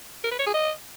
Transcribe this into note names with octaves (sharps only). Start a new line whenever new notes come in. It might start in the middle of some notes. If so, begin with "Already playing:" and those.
A#4
B4
C#5
G#4
D#5